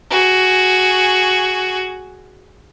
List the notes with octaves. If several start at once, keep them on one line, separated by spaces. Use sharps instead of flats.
F#4 G#4